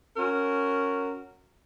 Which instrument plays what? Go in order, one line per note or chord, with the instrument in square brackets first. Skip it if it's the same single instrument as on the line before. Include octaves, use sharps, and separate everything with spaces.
[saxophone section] C#4 F#4 A#4